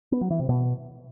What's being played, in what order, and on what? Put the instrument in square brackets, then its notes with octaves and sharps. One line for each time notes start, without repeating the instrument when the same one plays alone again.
[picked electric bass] B3
F#3
E3
C3
B2